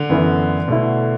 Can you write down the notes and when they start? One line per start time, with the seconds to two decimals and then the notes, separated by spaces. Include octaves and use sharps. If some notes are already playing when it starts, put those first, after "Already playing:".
Already playing: D3
0.10 F#2 E3 B3 E4
0.68 B2 A3 E4